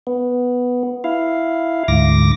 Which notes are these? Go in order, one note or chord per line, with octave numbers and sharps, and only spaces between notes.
B3
E4 F5
D2 G#2 D6 A#6